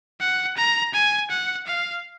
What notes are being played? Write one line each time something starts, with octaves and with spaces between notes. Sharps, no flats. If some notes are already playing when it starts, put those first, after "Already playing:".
F#5
A#5
G#5
F#5
F5